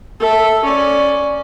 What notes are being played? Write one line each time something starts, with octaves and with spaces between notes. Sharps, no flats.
A4 E5
C#4 D5